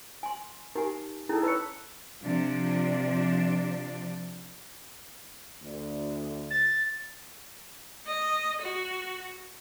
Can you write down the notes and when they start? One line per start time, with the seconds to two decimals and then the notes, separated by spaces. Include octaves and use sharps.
0.23 G#5 C6
0.76 D#4 G4 A#4 G#5
1.29 C#4 D#4 E4 G#4 A4 A5 A#5
1.43 B4 C#5 E6 C#7
2.23 C3 F3 D4
5.62 D2
6.50 A6
8.07 D#5
8.61 F#4